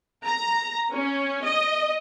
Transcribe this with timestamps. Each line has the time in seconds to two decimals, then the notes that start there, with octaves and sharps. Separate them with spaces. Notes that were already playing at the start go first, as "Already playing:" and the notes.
0.23 A#5
0.92 C#4
1.43 D#5